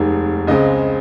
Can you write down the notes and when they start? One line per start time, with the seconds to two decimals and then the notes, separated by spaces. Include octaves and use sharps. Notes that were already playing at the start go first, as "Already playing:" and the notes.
Already playing: F1 D#2 D#3 G#3
0.47 C#2 C#3 G#3 C4 D#5